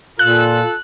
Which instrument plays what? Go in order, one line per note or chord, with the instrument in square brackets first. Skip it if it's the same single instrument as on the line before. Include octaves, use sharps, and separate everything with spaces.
[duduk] A#2 [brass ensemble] F4 A4 [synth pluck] F#6